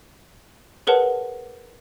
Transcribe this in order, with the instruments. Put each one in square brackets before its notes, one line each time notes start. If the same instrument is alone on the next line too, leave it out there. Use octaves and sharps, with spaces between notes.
[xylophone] G#4 A#4 B4 C#5 F#5 A5